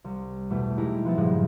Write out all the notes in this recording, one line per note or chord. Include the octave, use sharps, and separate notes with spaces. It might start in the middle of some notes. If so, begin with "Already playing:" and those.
C2
E2 B2 A3
G#3 D#4 E4 G4 G#4
F3 B3 E5 A6
G2 A#2 C#3 F3 F#3 G#3